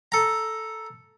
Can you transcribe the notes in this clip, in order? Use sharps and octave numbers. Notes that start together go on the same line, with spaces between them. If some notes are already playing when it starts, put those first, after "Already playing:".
A4 A#5